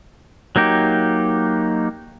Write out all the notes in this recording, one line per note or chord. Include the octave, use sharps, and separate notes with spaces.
F#3 A#3 D#4 G4